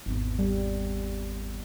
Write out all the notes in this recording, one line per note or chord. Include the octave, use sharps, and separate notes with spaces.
G#1 E2
G3